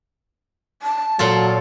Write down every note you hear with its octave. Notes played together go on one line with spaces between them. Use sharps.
A5
A#2 F#3 F4 A4